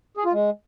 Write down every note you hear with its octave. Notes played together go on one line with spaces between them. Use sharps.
G#4
F4
G#3